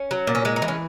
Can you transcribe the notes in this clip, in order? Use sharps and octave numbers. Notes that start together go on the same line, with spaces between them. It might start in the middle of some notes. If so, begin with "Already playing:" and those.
Already playing: C#4
F#3
A#2
C#4
G#3 D#4
D#4
E3
C#4